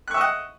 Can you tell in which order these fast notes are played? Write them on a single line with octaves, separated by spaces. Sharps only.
F#6 C#6 E5 D#5 F#5